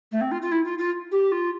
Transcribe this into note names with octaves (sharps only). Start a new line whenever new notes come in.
A3
C4
F4
F4
E4
F4
F4
G4
F4